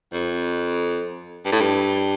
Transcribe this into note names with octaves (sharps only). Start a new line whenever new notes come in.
F2
G2
A2
G2